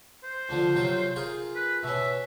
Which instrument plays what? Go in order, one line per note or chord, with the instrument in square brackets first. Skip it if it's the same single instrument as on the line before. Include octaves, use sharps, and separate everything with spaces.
[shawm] C5
[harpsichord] F2 D3 F3
C3 F#3 F4
F4 G#4 A#4
[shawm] B4
[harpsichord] B2 C#4 [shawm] E5